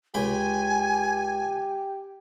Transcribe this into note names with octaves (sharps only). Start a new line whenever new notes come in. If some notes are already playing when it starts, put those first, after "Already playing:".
C#2 G4 G5 G#5 B5